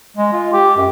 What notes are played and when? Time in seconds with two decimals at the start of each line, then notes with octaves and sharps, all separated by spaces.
0.17 G#3
0.33 F4
0.53 G4
0.77 F#2